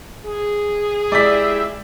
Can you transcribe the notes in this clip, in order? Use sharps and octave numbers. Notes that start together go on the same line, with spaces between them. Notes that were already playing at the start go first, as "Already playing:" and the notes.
G#4
G#3 E4 G4 D5 E5 B6